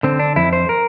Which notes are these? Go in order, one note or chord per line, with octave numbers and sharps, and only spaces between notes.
D3 C4
D4
F2 E4
C5
A#4